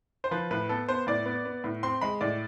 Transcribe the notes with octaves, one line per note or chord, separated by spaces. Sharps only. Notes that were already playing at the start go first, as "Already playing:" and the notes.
C5
F3 B4
A2 B4
B3 A4
B3 C5
A2 D5
B3
B3
A2
C4 C6
G#3 B5
A2 D5